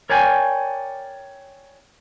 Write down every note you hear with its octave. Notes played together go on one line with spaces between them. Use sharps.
A#4 C#5 D5 G5 G#5